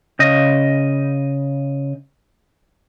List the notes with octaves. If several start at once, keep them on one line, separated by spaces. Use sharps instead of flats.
C#3 D#5